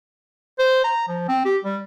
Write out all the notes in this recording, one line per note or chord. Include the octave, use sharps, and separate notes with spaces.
C5
A#5
F3
C4
G4
G3